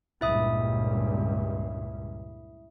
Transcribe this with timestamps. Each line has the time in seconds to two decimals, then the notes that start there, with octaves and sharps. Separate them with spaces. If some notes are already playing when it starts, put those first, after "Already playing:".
0.21 C#2 G2 A#2 E4 E5 D#6